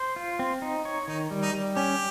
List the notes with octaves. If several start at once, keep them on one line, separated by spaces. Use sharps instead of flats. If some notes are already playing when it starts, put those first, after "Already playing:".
Already playing: C5
F4
C4
D#4
C#5
D#3 D#4
G3
D#4
G3
C#4 G4